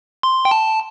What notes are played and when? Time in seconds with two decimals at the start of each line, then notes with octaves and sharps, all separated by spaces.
0.23 C6
0.45 G5
0.51 A5